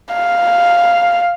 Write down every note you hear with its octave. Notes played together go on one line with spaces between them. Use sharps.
F5